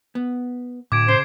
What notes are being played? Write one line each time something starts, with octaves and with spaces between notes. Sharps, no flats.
B3
D2 A2 D6 G#6 D7
C#3 C5 C7